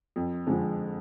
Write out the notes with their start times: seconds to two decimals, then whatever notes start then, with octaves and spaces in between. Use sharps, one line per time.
0.16 F2
0.47 D3 F3 G#3